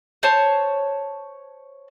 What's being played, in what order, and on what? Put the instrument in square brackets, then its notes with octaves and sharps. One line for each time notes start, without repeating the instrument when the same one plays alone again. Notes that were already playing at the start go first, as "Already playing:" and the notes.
[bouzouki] C5 C#5 A5